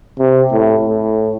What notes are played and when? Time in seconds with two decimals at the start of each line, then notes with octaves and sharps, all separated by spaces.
0.19 C3
0.52 A2
0.86 A2